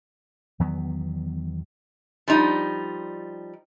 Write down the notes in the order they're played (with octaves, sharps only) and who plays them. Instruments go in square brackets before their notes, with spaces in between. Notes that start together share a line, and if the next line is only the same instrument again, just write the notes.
[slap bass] E2 D#3 F#3 B3
[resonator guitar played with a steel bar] F3 G3 D#4